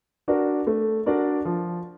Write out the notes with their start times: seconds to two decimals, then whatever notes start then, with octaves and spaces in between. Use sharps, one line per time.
0.28 D4 F#4 A#4 D5
0.67 A3
1.06 D4 F#4 A#4 D5
1.45 F3